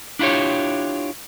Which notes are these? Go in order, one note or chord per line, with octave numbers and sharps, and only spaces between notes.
D4 E4 F4 G4 C#5